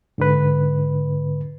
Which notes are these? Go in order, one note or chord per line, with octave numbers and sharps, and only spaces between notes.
G#2 D3 B4